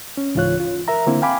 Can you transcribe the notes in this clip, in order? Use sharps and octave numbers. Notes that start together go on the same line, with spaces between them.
C#4
C#2 G#2 E3 F4 C#5 F#6
F4
A#4 E5 A#5
D3 A#3 C4 E4
F5 G5 G#5 B5 D6